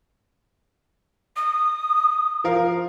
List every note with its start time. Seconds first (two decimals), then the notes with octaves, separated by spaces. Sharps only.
1.36 D#6
2.44 F3 A#4 F5